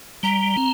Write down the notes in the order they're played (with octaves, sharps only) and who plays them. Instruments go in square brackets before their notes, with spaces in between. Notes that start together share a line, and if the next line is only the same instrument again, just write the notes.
[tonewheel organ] G3 [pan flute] A#5
[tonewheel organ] C4